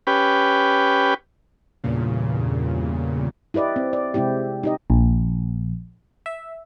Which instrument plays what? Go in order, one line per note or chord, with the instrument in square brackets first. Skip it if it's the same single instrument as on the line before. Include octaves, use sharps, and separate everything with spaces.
[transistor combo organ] C#4 G4 B4
[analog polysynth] E2 G2 A#2 C#3
[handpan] E4 G4 B4 D5 D#5
C4
D5
C3 G#3 C4 E4 G4
D#4 G4 D#5
[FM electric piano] A#1
E5